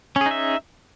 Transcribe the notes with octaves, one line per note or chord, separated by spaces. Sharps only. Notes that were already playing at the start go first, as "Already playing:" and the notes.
C#4 D#4 G#4 E5